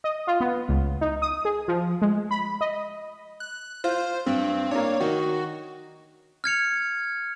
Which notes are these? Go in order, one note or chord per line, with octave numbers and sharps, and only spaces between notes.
D#5
F4
B3
C#2
D#4
D#6
G#4
F3
G#3
B5
D#5
F#6
F4 C5
G2 C4
A#3 D4 C#5
D#3 F#4
F6 G#6 C#7 F7